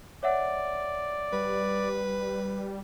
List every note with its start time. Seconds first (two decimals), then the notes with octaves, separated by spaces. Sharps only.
0.23 C#5 D5 E5 F#5
1.32 G3 B4